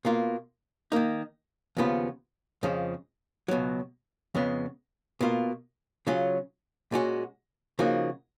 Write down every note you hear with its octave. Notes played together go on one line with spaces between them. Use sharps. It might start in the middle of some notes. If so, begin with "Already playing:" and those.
B2 A#3 F4
D#3 A#3 D#4
D#2 C#3 F3 B3 F4
F2 C#3 F3 G#3
C#2 B2 F#3
F2 C#3 G#3 B3
B2 A#3 F4
C#3 F#3 C#4 F4
A#2 G#3 C#4 F#4
C#3 F3 A#3 D#4 F#4